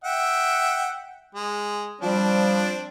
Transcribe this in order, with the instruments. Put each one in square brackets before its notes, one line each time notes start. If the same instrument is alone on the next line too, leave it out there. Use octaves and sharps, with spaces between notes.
[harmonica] E5 F#5 G5
G#3
[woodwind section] F3 G3 [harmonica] C4 D4